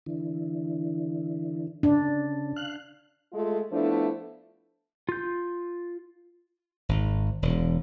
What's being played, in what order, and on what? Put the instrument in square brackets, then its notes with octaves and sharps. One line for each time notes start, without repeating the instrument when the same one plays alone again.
[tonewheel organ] D3 E3
[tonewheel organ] C#3 [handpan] D4
[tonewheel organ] F5 F#6
[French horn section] G#3 A3 F4
F3 A3 B3 D4 E4
[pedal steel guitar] F4 G6
[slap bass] G#1
E1